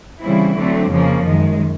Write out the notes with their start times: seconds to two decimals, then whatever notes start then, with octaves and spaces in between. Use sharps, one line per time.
0.22 C#3 E3 G3 C4 E4
0.57 D3 F#3 A3 C4
0.90 F2 C#3 F3 A#3
1.25 F#2 D#3 G#3